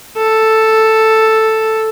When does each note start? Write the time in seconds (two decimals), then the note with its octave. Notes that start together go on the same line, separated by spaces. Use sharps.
0.17 A4